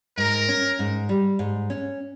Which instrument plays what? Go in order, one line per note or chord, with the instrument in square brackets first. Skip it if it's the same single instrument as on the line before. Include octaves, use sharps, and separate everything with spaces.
[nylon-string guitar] G#2 [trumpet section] A#4
[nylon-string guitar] C#4
G#2
G3
G#2
C#4